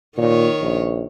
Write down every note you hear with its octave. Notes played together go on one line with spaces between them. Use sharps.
A#2 D#3 C#5
A#1